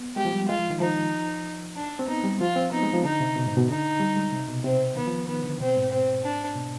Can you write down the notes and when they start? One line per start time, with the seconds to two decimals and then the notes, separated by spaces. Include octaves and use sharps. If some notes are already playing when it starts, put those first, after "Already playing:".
Already playing: B3
0.16 G#3 G4
0.25 F3
0.32 G3
0.48 G#3 F4
0.59 F3
0.70 D#3
0.80 F3 D#4
1.76 D4
1.99 C4
2.08 B3 D#4
2.24 G3
2.40 F3 F4
2.56 C4
2.72 B3 D#4
2.83 G#3
2.93 F3
3.04 D3 D#4
3.20 C3
3.36 B2
3.46 G#2
3.57 B2
3.68 D3 D#4
4.00 G3
4.16 G#3
4.32 C3
4.48 B2
4.64 C3 C4
4.96 D#3 B3
5.06 F3
5.28 D#3 B3
5.44 D3
5.60 B2 C4
5.76 G#2
5.92 C4
6.24 D4
6.56 B2